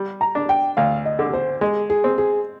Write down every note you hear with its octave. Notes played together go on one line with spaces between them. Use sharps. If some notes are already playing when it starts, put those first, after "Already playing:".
Already playing: G3
A#5
D4
G5
D2 F5
D#5
D3
C5
G#3 G#4
G#4
C4
G#4